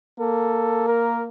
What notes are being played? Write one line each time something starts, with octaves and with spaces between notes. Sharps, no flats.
A#3 A4
A#4